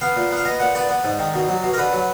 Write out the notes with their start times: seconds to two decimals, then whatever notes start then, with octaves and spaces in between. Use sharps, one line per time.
0.01 B3 F5
0.16 A#2
0.31 B3
0.37 F5
0.45 B3 D#5
0.60 A#2 F#5
0.75 B3 D5
0.89 B3
1.04 G#2
1.19 D#3
1.34 B2
1.48 F#3
1.63 B2
1.73 A#4
1.78 D3 B4
1.93 F#3